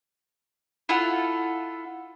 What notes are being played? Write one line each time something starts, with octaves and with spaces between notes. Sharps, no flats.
E4 F4 A4 F#5